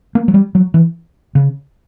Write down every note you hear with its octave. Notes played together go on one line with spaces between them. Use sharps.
A#3
F#3
G3
F#3
E3
C#3